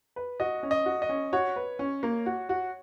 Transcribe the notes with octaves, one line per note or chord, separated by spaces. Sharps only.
B4
F#4 D#5
C#4
D#5
F#4
D#5
C#4
F#4 C#5
B4
C#4
A#3
F#4
F#4